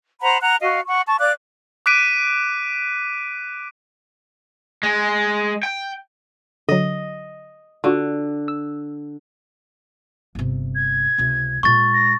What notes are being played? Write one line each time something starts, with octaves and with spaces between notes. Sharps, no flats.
C5 F#5 A#5 B5
F#5 A#5 F#6
F#4 D#5 F5
F#5 C#6
A5 C#6
D5 F5 D6 F#6
D6 F#6 B6 D7 D#7
G#3
G5
D3 F#3 D#5
D3 F4 F#4
E6
G1 C3
G#6
C#2 C3
A#2 G#3 C#6 A6
A#6